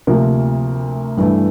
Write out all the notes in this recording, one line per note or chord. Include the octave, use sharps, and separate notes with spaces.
D2 C3 F3 A#3
G2 E3 A3